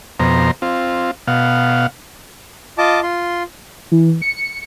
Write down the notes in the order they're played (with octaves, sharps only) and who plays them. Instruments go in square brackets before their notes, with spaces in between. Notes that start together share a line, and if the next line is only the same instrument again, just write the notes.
[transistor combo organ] F2 B2 C5 A#5
C4 F4
B2 F5 F#5
[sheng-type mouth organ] F4 D#5 A5 D6
F4 C6
[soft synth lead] E3
C#7